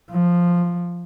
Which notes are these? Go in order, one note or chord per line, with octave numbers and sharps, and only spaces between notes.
F3